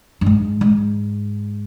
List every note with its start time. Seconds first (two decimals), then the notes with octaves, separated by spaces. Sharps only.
0.21 G2
0.26 G#2
0.61 G#2